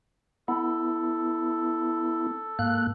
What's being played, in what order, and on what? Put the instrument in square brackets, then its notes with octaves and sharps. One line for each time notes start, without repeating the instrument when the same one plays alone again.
[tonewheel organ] B3 E4 [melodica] A4
[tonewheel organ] G#2 A#3 F#6